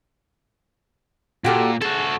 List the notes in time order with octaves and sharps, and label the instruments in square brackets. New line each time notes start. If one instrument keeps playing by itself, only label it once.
[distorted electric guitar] A#2 [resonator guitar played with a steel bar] F#4 G4 A4
[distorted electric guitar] F#4 A4 [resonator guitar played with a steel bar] G#4